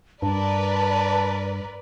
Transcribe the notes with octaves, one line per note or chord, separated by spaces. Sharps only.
G2 A#4 B4 D5 A5